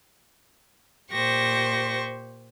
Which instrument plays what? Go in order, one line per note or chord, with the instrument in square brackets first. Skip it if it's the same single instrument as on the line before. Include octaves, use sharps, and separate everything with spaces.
[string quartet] A#2 G4 C5 C#6 A#6